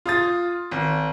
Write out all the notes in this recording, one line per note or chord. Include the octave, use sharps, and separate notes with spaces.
F4 D#6 A6
G#1